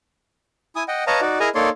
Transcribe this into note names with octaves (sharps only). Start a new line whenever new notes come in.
E4 G#5 D#6
D#5 F#5 G5
B4 C#5 D#5 F5 A5 A#5
D#4 F#4 D5
E4 G#4 A#4 D#5 G#5 A#5
A#3 D#4 A4 C#5 D5 C6